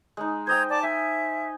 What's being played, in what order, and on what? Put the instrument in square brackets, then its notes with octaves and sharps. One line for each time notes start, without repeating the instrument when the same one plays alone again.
[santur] G#3 D#4
[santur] C5 D#5 G5 [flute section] A#5 G6 G#6
[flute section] D5 A5 D6
[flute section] E5 [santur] G#5